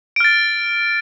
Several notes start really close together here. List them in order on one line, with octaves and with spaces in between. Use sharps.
D7 F6 A6